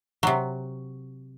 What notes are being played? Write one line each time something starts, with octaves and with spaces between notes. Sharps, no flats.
C3 F#3